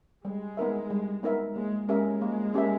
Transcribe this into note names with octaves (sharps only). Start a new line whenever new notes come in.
G3 G#3
B3 D#4 A#4 E5
G3
B3 D#4 A#4 E5
G#3 A#3
G#3 C#4 G4 A#4 E5
A#3
C#4 G4 A#4 E5